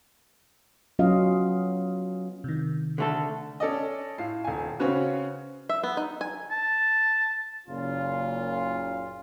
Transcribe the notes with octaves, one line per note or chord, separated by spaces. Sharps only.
F#3 B3 C#4 F4 D#5 F5
C3 D#3
D3 A3 A4
C#4 A4 D5 D#5
A2 F4 C7
D#1 G#5
C#3 C4 C#4 F#4 B4
E5
B3
D#4
G#5
A5
F#1 A#2 C#3 F4